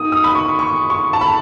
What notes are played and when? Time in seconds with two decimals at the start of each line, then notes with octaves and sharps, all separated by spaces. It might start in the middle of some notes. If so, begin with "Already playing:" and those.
Already playing: D#3 D#6
0.12 D#6
0.24 B5
0.35 C#6
0.59 C#6
0.90 C#6
1.13 A5
1.21 B5